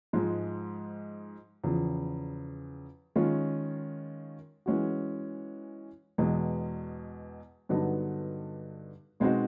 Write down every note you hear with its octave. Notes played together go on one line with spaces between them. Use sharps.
G#2 F3 G#3
E2 C#3 F3
D#3 G#3 C#4 F4
E3 G#3 C#4 F#4
E2 B2 G#3
G2 D3 F#3 B3 D#4
B2 G#3 C4 D#4 F#4